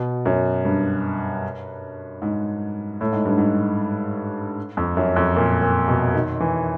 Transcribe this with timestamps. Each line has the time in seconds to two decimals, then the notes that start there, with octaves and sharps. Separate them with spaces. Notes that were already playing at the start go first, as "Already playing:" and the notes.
Already playing: B2
0.25 F#2
0.65 G2
2.22 G#2
3.01 A2
3.13 G#2
3.25 G2
3.38 G#2
4.77 F2
4.97 F#2
5.16 F2
5.36 A#2
5.62 A#2
5.88 B2
6.14 D#3
6.40 E3